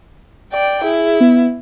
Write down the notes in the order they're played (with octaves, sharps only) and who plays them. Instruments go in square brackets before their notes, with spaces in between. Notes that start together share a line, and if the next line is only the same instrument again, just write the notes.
[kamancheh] D5 G5
[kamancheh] E4 [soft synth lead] G#4
[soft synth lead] B3